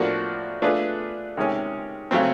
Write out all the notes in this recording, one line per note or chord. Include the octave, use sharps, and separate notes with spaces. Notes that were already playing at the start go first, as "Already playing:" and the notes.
Already playing: A2 F3 A#3 D4 F#4
A3 D4 F4 G#4 B4
C3 D#3 G#3 C#4
C#3 F#3 A3 C4